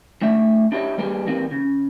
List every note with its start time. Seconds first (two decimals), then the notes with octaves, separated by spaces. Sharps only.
0.22 A2 A3 D4 E5
0.72 D4 E4 G4 G#4 C#5 D#5
0.98 G3 A#3 B3 D4 G4 G#4
1.27 E3 G3 A#3 C4 D#4
1.51 C#3